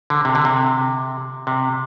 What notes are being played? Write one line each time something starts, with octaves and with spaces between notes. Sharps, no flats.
D3
C3
D3
C3
C3